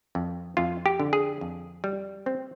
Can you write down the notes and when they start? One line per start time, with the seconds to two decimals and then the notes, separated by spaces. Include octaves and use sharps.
0.15 F2
0.57 F2 F4
0.86 G4
1.00 D3
1.13 G#4
1.41 F2
1.84 G3
2.26 C4